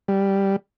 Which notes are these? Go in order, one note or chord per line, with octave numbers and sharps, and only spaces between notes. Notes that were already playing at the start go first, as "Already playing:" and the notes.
G3